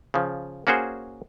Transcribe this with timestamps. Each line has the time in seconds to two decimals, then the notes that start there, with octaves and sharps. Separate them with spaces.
0.14 C#3 F3
0.67 A#3 C#4 F#4 G#4 C5